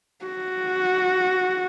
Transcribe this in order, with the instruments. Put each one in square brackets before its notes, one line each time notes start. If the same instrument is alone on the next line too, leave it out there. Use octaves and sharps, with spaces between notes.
[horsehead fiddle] F#4